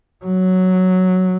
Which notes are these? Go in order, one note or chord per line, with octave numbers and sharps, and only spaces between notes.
F#3